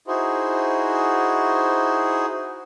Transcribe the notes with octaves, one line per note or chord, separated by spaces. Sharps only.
D#4 E4 F#4 G#4 C5